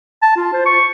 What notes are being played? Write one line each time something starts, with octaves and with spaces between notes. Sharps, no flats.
A5
F4
C5
C#6